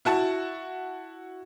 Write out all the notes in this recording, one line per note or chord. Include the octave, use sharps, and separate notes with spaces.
E4 F#4 A5